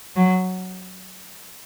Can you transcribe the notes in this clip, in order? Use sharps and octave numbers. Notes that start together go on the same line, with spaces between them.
F#3